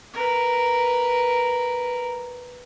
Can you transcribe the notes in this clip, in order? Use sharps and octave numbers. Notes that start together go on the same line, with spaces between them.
A#4 B4